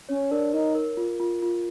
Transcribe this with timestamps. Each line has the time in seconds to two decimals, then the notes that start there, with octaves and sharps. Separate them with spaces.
0.09 C#4 C#5
0.31 D4 A#4
0.53 D#4 A#4
0.75 A#4
0.97 F4
1.20 F4
1.42 F4